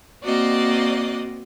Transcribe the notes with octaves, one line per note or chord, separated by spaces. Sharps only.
A#3 C4 F#4 D5 D#5